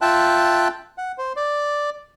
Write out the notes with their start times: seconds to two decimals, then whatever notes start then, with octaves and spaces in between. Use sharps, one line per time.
0.02 F4 E5 G5 A5 F#6
0.98 F#5
1.18 C5
1.36 D5